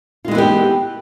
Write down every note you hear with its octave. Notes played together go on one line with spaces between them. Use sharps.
E3 G#3 B3 F4 G4